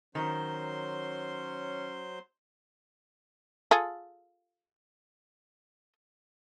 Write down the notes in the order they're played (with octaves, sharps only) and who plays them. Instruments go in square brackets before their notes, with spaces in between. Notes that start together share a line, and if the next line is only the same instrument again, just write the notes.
[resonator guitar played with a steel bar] D#3 [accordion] F#3 C5 C6 [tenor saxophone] C#4
[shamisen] F4 G#4 A4